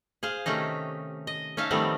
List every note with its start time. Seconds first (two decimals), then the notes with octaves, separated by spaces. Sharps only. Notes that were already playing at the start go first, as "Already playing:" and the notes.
0.23 G#4 C5 F5
0.46 C3 D#3 A3 C#4 D#4
1.27 D#5
1.57 C#4 D#4 E5 F5 A5
1.70 D#3 F3 G3 A3 B3 C4